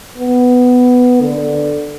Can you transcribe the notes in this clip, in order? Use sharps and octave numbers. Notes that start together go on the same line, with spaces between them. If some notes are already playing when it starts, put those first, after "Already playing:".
B3
D3